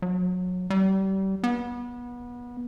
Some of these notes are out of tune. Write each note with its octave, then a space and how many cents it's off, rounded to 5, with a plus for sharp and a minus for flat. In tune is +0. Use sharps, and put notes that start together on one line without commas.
F#3 -25
G3 -30
B3 -25